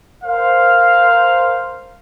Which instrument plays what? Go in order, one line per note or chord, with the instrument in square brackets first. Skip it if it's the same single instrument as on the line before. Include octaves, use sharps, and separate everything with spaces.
[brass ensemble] A#4 C5 F5